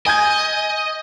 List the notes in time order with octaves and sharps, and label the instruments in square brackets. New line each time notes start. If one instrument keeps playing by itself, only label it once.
[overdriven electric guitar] D#5 [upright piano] G#5 G6 G#6